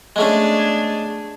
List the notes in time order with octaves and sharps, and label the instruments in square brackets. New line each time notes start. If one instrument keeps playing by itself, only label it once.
[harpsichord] G#3 A3 C#4 [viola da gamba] B3 D4 G#4